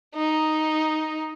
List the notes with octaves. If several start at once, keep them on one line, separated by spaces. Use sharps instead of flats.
D#4